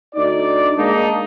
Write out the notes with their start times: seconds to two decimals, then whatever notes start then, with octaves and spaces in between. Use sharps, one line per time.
0.15 D2 D#4 D5
0.77 G#3 A#3 D4 D#4